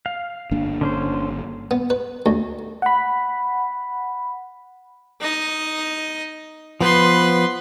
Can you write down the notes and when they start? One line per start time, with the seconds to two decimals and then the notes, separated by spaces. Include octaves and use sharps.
0.06 F5
0.51 G1 A#3 D4
0.81 D3 C#4 C5
1.71 B3
1.90 B4
2.26 D2
2.82 F#5 B5
5.21 D#4 D#5
6.81 F3 B3 B4 C5 C6